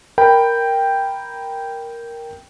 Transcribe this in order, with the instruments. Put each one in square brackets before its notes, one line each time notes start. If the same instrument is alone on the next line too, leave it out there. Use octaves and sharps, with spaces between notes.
[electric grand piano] A#4 G5 B5